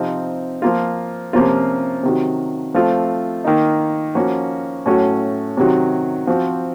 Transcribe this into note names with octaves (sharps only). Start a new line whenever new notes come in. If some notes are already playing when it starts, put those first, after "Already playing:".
Already playing: C3 F3 C4 D#4
F3 A#3 F4
C3 F3 A#3 C#4 F4
C3 D#3 F#3
F3 A3 C4 F4
D#3 A#3 D#4
F3 A#3 C#4 F#4
A2 F#3 A3 C#4 F#4
C3 D#3 F#3
F3 C4 F#4